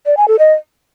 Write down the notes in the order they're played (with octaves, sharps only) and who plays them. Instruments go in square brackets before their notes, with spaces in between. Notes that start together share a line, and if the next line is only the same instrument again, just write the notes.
[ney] D5
G#5
A4
D#5